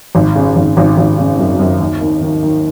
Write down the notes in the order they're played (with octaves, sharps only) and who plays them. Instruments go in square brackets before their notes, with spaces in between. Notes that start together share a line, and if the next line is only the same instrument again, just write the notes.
[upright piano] G#1
C#3
G#1
G#1
G#1
C#3
F#2
F#2
D#2
D#3
D#3
D#3